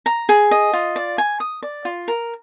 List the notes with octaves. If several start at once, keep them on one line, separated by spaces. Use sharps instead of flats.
A#5
G#4
D#5
F4
D5
G#5
D#6
D5
F4
A#4